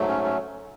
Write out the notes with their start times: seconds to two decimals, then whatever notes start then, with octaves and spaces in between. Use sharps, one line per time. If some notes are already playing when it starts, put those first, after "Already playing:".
Already playing: G#2 F#3 A3
0.08 C#4
0.23 C#4